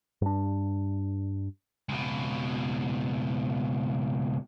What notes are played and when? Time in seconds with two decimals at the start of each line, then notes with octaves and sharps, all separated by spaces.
0.22 G2 D4
1.89 C#2 B2